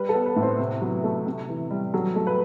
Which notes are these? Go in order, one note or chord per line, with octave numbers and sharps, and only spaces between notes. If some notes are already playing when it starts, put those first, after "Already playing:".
Already playing: G3 B4
A4
B3
B4
A2
C4 C5
C3
F#3
A3
C3
E3
G3
F#3 A4
A3
B4